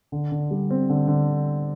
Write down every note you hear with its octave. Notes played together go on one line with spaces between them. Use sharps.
D3
D3
G3
C4
D3
D3